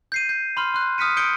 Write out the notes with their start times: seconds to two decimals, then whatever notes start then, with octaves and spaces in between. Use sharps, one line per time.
0.12 G6 C7 D#7
0.29 G6
0.57 B5 C6 F6
0.74 C6 F#6
0.98 D#6 F6 B6 C#7 D#7
1.17 D#6 G6 C#7 D7 G7